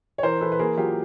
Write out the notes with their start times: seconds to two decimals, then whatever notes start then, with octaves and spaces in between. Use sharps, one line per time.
0.18 C#5
0.23 E3 A#4 C5
0.41 E3 A4 B4
0.52 B4
0.59 A#3 G#4 A#4
0.77 F#3 F4 G4